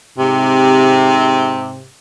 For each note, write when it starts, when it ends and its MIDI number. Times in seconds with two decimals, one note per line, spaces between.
0.18 1.89 44
0.18 1.89 48